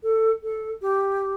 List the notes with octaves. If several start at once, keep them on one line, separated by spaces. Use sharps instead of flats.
A4
A4
G4